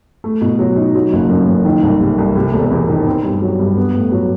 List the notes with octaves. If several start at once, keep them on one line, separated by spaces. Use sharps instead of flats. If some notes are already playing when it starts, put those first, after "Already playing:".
A3
B2
F#3
D#4
F#3
F#1
F#2
F#1
D#3
C2
C3
C2
C3
E1
E2
D#3
C4
G2
F#3
G2
B3
A2
F#3